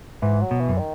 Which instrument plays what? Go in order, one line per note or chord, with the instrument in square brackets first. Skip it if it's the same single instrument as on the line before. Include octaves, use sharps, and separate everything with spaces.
[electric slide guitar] G#2 [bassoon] E3
[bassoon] F#3
[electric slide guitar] B2
[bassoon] E3
[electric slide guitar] F#2
[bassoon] D#3